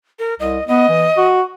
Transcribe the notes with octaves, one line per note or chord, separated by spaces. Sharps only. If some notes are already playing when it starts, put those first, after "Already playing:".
A#4
C2 D#5
B3 D#5
E3
F#4